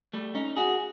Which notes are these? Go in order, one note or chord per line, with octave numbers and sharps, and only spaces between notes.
G3 A3
C#4 D#4
F#4 G#4